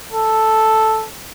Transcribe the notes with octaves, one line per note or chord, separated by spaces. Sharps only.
A4